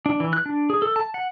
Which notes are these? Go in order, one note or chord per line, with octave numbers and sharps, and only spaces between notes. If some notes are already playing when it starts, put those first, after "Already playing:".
D4
E3
F#6
D4
G#4
A4
A5
F#5